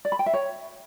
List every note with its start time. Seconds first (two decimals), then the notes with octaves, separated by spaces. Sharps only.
0.05 D5
0.12 B5
0.19 G5
0.26 E5
0.33 C#5